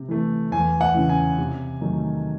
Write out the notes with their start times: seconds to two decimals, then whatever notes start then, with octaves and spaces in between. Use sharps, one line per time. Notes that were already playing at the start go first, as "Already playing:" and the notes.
Already playing: C3
0.08 E3 A3
0.52 E2 G#5
0.81 F#5
0.94 C#3 E3
1.09 G#5
1.38 C3
1.81 D#3 F#3 A3